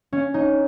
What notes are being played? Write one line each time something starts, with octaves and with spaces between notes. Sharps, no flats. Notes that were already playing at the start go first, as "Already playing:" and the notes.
C#4
D#4